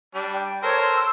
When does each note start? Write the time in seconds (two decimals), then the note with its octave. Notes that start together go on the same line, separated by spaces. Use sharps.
0.15 G3 D4
0.32 G5
0.63 A4 A#4 C5 C#5
0.79 C6
0.96 E6